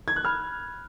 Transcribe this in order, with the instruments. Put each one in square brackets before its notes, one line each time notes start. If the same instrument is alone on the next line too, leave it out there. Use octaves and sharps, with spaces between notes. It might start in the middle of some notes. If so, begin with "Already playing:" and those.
[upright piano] G#6
F#6
[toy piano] B5 [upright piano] F6